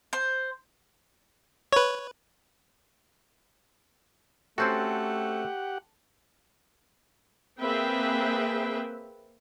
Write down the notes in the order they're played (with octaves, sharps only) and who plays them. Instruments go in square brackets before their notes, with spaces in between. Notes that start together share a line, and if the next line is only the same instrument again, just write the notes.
[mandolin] C5
[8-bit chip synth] B4 C#5
[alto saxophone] A3 [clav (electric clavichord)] C4 C#4 F#4 [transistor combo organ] G4 F#5 [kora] A4 C5
[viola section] A#3 C4 G#4 B4 E5 G5